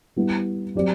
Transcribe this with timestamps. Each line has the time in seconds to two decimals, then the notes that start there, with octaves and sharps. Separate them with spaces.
0.16 G3 B3 E4
0.75 F#3 C4 G4 D5